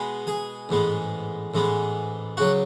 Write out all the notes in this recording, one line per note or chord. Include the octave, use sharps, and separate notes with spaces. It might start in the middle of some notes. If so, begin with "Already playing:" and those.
Already playing: B2 G#3 B3
G#4 G#5
A1 G#2 G#3 B3
A1 G#2 G#3 B3
C#2 C#3 F#3 F#4 F#5